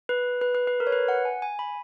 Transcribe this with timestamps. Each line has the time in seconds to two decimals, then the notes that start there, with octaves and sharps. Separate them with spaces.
0.09 B4
0.41 B4
0.55 B4
0.67 B4
0.80 A#4
0.87 C#5
0.92 B4
1.08 F#5
1.25 G#5
1.42 G#5
1.59 B5